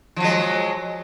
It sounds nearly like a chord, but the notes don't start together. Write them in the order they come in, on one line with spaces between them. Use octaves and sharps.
F3 F#3 G#3